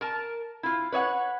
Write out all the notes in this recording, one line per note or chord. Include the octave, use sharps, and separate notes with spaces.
A#4 A5
E4 F4
B4 C#5 D#5 F#5